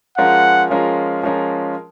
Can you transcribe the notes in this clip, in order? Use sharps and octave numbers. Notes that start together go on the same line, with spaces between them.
F3 G#3 C#4 F4 A#4 F#5
F3 G#3 C#4 F4 A#4
F3 G#3 C#4 F4 A#4